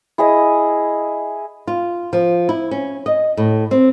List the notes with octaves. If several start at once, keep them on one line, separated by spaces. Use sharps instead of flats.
E4 G#4 D#5
F4
F3
E4
C#4
D#5
A2
C4